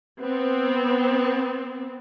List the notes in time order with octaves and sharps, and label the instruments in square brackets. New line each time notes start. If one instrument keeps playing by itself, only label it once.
[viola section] B3 C4